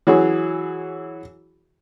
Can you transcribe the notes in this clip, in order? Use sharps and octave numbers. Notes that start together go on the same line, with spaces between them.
E3 F#3 F#4 G#4 C#5